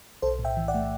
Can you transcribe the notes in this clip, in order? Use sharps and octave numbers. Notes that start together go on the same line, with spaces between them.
B1 A4 C5
A2
E5 G5
E3
D5 F#5
A3